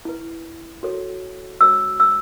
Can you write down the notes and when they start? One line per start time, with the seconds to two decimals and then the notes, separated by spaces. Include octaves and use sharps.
0.05 E4 B4
0.83 F#4 A4 C#5
1.61 F#4 C#5 E6
2.00 E6